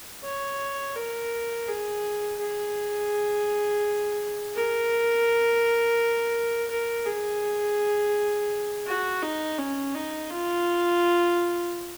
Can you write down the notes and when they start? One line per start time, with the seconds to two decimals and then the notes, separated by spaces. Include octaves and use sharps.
0.24 C#5
0.95 A#4
1.68 G#4
2.39 G#4
4.55 A#4
6.70 A#4
7.06 G#4
8.86 F#4
9.22 D#4
9.58 C#4
9.94 D#4
10.30 F4